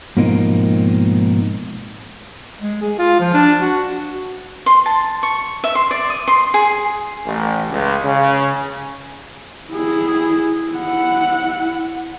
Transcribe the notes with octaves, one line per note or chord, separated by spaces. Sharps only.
G#2 B2 F3 A#3 C4 D#4
G#3
G#4
F4
F3
D4
F#4
C6
A5
C#6
E5
C6
D5
D#6
C6
G#4
A1
C#2
C#3
E4 G#4
E4 F#5